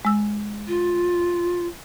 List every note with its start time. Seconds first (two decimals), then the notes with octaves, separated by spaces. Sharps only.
0.05 G#3 E6
0.68 F4